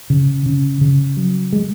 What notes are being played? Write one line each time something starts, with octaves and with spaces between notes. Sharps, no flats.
C#3
C#3
C#3
F#3
G#3